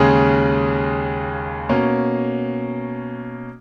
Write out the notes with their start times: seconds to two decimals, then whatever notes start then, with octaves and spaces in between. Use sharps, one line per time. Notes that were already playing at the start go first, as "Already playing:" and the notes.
Already playing: D#2 C#3 G#3 C#4 G#4
1.69 B2 A#3 C#4